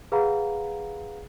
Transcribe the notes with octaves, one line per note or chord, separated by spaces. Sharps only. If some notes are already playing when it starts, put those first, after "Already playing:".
G#4 B4 F5 F#5 A#5 B5